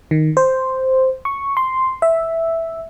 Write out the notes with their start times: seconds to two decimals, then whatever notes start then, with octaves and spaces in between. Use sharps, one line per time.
0.11 D#3
0.37 C5
1.25 C#6
1.57 C6
2.02 E5